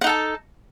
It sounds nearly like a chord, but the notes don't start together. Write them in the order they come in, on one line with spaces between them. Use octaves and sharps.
F#5 D#4 A4 A5